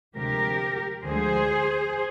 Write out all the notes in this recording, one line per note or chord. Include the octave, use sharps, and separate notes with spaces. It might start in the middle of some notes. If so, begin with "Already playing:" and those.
D2 C3 F3 G#3 G4 A#4
D2 D3 F3 G#3 G#4 C5